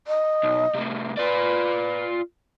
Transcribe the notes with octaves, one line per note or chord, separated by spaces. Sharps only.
D#5
B1
A2 C3
F4 B4 D5